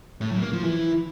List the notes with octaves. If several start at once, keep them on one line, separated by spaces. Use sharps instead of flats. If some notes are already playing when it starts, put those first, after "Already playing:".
A2
F#2
A#3
F3
E3